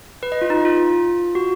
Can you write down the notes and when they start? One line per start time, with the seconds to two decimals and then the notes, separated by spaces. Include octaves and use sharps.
0.23 B4
0.32 D#5
0.42 F4
0.50 D#4
0.65 F4
1.35 F#4